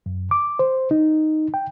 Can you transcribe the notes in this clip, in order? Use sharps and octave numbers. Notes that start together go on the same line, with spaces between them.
F#2
D6
C5
D#4
G5